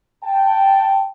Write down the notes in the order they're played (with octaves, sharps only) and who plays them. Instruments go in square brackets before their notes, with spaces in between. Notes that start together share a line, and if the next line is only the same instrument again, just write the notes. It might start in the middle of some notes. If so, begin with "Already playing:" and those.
[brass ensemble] G5 A5